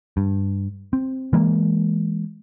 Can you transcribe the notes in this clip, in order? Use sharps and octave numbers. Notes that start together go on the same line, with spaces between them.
G2
C4
E3 G#3 A#3